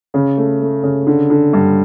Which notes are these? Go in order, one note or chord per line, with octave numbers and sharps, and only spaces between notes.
C#3
A3
A3
C#3
D3
D3
G2